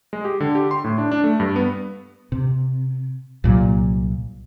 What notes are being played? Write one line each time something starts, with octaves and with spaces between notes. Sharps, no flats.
G#3
G4
D3
G4
C6
A2
D4
D4
A3
G2
B3
C3
C2 A#2 F#3